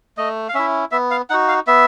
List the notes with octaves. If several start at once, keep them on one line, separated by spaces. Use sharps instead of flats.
A3 D#5
F5
C#4 E4 E5
B3 E5
F5
D#4 F#4 F#5
F5
B3 E5